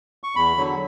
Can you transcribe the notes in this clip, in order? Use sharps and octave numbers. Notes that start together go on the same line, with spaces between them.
C#6
E2 B5
D3 F#3